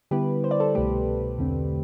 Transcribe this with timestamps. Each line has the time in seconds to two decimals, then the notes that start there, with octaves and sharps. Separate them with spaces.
0.11 D3 G3 B3 E4 G4 B4
0.44 C5
0.51 D5
0.60 A4 C5
0.75 C2 B2 A3 G4 B4
1.39 E2 D3 A3 C4